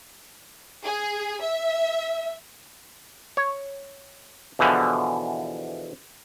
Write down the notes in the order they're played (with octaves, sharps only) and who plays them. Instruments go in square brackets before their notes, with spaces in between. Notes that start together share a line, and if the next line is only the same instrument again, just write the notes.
[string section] G#4
E5
[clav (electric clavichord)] C#5
E2 B2 D3 E3 F3